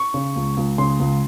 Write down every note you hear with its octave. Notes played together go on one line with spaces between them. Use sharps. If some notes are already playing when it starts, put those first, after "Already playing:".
Already playing: C#6
C#3
C#2
C#2
C#3 C6
C#2